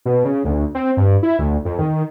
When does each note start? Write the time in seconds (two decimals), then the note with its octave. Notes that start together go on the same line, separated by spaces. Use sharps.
0.05 B2
0.25 C#3
0.45 D2
0.75 C4
0.97 G2
1.23 E4
1.39 D2
1.65 F2
1.79 D#3